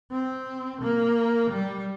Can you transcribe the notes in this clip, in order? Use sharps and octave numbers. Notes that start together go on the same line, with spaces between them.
C4
A#3
G3